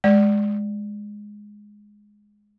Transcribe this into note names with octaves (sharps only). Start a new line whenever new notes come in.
G#3 D5